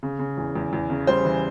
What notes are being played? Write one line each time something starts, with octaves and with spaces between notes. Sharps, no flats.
C#3
C#3
E2
E2
E2
C#3
G3 C5
E3